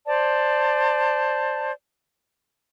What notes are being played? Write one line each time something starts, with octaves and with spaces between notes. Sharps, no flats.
C5 D5 A5